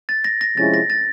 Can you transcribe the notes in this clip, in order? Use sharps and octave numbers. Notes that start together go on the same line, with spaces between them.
A6
A#6
A#6
C3 F3 G#3 C#4 E4 A6
A#6
A6